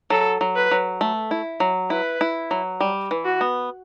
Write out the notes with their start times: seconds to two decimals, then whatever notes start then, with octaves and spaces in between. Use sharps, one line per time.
0.10 F#3 A4
0.41 F#3
0.55 B4
0.71 F#3
1.01 A3
1.31 E4
1.60 F#3
1.90 E4 B4
2.21 E4
2.51 F#3
2.80 G3
3.11 E3
3.25 F#4
3.41 B3